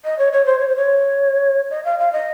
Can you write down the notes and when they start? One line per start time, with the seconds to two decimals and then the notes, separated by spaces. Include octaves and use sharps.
0.05 D#5
0.18 C#5
0.32 C#5
0.46 C5
0.59 C#5
0.68 C5
0.76 C#5
1.70 D#5
1.85 F5
1.99 F5
2.12 D#5